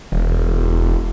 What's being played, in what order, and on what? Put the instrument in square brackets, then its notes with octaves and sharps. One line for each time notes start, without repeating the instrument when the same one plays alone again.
[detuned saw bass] E1